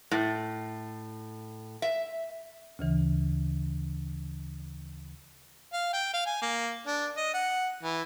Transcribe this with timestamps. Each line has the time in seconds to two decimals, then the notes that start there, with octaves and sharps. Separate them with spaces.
0.11 A2
1.82 E5
2.79 D2 C#3 E3
5.73 F5
5.93 G5
6.13 F5
6.26 G#5
6.42 A#3
6.87 D4
7.17 D#5
7.34 F#5
7.83 E3